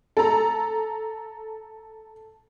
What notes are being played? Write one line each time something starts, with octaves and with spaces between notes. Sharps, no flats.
A4 A#5